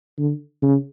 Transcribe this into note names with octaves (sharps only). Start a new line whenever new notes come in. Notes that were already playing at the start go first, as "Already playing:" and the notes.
D3
C#3